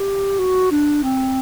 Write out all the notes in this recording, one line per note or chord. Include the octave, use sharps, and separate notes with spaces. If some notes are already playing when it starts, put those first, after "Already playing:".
Already playing: G4
F#4
D4
C4